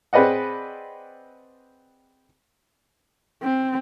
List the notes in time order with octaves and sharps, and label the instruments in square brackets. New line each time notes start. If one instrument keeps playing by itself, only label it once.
[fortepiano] C4 G#4 B4 D5 D#5 F#5
[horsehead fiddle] C4